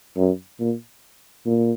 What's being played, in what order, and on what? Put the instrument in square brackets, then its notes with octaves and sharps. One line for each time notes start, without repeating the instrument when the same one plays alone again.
[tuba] F#2
A#2
A#2